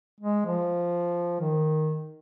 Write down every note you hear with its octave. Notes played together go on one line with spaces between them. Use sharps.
G#3
F3
D#3